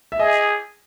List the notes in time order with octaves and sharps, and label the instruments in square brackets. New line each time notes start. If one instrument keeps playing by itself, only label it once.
[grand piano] E5
[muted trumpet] G#4 [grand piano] D#5